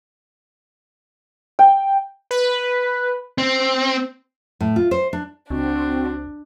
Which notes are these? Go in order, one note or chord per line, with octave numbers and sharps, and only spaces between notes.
G5
B4
C4
A2
F4
C5
D4
C#2 C4 D4 F#4